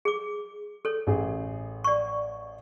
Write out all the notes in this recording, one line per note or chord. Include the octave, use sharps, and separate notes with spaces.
G#4 D6
A4 C#5
A1 G#4
D5 C#6